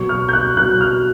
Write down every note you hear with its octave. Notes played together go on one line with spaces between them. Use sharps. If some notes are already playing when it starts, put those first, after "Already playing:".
Already playing: B2 F#3 C#6
F6
G6
F#6
B2 F#3 F#6
F6